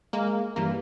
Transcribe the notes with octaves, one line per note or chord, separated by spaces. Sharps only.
G#3 A#3
G2 E3 A#3